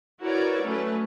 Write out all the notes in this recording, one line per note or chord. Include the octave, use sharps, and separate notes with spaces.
E4 F#4 A#4 B4 C#5 D5
F#3 A3 C#4 B4